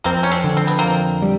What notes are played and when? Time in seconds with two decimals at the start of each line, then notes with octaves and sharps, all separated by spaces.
0.04 F2 A#3 C4
0.23 C#4
0.31 C4 D4
0.44 D3
0.57 C4
0.67 B3
0.79 F2 A#3 C4
1.22 G3